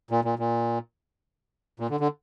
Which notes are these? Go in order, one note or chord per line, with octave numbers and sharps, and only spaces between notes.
A#2
A#2
A#2
A#2
D3
D3